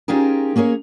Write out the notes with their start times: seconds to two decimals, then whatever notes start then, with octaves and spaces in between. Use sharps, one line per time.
0.08 C#4 D#4 F4 G4 G#4 A#4
0.56 A#3 C#4 G#4 A#4 C#5